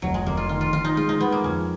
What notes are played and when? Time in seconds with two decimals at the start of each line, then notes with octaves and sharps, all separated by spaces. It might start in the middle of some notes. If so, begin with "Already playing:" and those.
0.02 F1 F#3
0.14 G#3
0.26 F1 A#3
0.37 F4
0.49 D#3 F4
0.61 F4
0.73 D#3 F4
0.85 D#4
0.97 G#3 F4
1.09 D#4
1.21 G#3 B3
1.32 A#3
1.44 F2 C#4